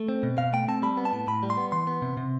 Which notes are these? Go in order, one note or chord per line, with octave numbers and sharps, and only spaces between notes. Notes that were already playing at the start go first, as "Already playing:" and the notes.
Already playing: A3
C4
B2
B2 F5
A3 G5
C4 A5
G3 B5
B3
A5
A2
A2 B5
G3
C6
B3
E3 C6
B3
C3
C3